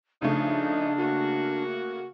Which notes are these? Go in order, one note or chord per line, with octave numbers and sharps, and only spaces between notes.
C#3 F3 A3 D4 D#4
A#3 F#4